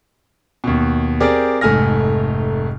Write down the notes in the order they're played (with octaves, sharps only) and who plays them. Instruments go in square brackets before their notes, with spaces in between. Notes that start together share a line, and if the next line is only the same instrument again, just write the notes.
[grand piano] D#2 B2
C4 G4 G#4 A#4 D5
F1 G#2 A3 G#5 F6 A#6